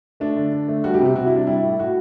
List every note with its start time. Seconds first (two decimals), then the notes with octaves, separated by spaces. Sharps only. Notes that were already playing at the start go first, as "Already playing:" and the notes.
0.20 A3 D4
0.37 D3
0.52 D3
0.68 A3
0.84 G3 F#4
0.94 G4
1.00 C3
1.06 G4
1.15 C3 F#4
1.26 G3 E4
1.36 D4
1.47 G3 E4
1.63 A2
1.79 A2 F#4